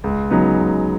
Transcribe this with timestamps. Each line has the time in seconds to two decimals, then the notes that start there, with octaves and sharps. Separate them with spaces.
0.04 C#2
0.31 C#3 F#3 B3 D#4
0.58 C#2